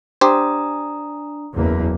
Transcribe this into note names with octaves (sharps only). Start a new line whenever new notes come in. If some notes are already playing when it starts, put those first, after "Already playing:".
D4 G4 C5 A#5 D#6
F#1 E2 A#3